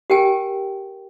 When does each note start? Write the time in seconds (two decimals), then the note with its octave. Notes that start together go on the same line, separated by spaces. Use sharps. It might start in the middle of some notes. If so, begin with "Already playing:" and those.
0.10 G4 A#4 G5 G#5